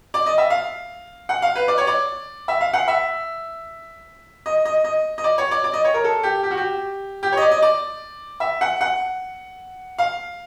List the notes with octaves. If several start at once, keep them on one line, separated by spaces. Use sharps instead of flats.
D5
D#5
E5
F5
F#5
F5
B4
D5
C#5
D5
E5
F5
F#5
E5
D#5
D#5
D#5
D#5
D5
C#5
D5
D5
D#5
C#5
A#4
A4
G4
G4
F#4
G4
G4
C#5 D#5
D5
D#5
D5
E5
F#5
F#5
F5